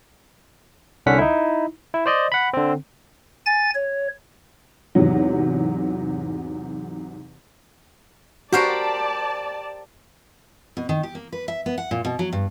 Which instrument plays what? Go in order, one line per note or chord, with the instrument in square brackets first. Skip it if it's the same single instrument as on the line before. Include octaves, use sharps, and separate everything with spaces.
[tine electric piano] C2 D3 C#4 F#5 B6
D#4 E4
E4
C5 D5 D#5
F#5 B5
D3 C4
[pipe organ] G#5 A6
C#5
[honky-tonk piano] E2 G#2 C3 F#3
[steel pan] F#4 [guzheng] G4 A#4 C5 [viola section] D5 A5
[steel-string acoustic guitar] B2
D#3
G4
A#3
B4
E5
B3
F#5
A#2
B2
F#3
G2